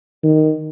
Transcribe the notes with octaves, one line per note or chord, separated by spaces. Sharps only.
D#3